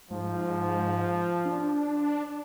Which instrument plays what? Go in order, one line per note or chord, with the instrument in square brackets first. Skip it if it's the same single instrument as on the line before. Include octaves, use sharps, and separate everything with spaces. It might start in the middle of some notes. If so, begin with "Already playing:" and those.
[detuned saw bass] G#2 [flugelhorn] F3
[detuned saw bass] D4